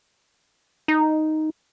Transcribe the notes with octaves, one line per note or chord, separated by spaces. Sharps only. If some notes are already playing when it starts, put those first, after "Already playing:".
D#4